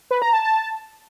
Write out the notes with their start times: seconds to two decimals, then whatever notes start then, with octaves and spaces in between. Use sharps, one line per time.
0.11 B4
0.22 A#5
0.33 A5
0.44 A5